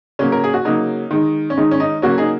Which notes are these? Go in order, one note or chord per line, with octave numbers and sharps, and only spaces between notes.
C#3 F#3 A#3 C#4
A#4
G#4
F#4
C#3 F#3 A#3 D#4
D#3 G#3
C#4
D#3 G#3 D#4
C#4
D#4
C#3 F#3 A#3 C#4 F#4
D#4 G#4